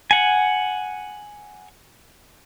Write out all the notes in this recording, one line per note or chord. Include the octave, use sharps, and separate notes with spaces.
F#5 G#5